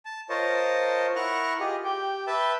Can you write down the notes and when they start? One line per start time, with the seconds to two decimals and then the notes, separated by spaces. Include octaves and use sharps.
0.05 A5
0.29 F4 A#4 C5 C#5 D#5 A5
1.16 E4 A#4 F#5 C#6 F6 F#6
1.60 F4 G4 G#4 D#5
1.84 G4 G5
2.27 B4 E5 G5 A5 B5